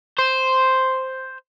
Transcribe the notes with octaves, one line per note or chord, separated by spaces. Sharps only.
C5